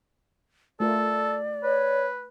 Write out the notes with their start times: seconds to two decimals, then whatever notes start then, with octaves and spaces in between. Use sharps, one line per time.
0.80 A3 F4 A4 A#4 D5
1.63 B4 C#5